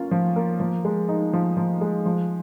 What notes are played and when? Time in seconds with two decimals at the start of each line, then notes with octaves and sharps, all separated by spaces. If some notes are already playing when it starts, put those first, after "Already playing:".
Already playing: A#3 C#4 F4
0.11 F3
0.36 A#3
0.60 F3
0.85 G#3
1.09 D#4
1.33 F3
1.57 F3
1.81 G#3
2.06 F3